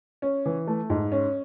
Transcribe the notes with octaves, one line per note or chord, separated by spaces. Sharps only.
C#4
E3
A3
G#2
C#4